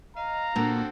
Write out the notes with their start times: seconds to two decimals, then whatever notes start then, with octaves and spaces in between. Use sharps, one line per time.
0.17 D#5 F5 A#5
0.56 A#2 A#3 C4 D4 F#4 A4